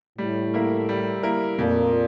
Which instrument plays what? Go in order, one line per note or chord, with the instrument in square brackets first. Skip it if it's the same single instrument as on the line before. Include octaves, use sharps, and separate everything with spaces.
[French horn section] A2 [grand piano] G3
[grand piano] A#3 E4 A#4
G3
A#3 E4 A#4
[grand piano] F2 [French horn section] A#2